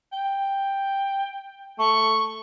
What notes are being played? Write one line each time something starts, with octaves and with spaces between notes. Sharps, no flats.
G5
A3 C#6